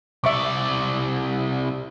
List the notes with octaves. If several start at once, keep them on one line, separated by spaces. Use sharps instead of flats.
C2 D5 E5 C#6 D6